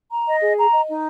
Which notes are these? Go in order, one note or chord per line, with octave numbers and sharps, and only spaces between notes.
A#5
D#5
G#4
A#5
D#5
D#4